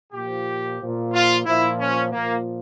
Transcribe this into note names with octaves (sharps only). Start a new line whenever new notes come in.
A#2 F3 G4
A#2 F3
F4
A#2 F3 E4
C#4
A#2 F3 A#3